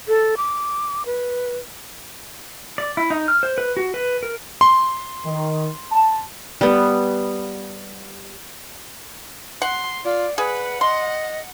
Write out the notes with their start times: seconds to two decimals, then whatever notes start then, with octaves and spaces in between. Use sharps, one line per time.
0.08 A4
0.37 D6
1.06 B4
2.78 D5
2.97 E4
3.10 D#4
3.28 F6
3.43 C5
3.58 B4
3.77 F#4
3.94 B4
4.23 A#4
4.61 C6
5.25 D#3
5.92 A5
6.61 G3 B3
9.62 F#5 C6
10.04 F4 D5
10.38 G#4 B4 F#5
10.81 D#5 C6